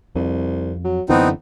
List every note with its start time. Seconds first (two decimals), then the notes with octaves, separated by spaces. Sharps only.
0.15 C2 F2
0.84 F#3
1.09 F#2 D3 E3 B3 C4 D#4